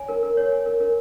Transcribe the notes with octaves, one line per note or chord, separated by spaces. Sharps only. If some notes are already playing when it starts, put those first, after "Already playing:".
Already playing: C#5 G#5
A#4
A#4
C#5
G#5
A#4
A#4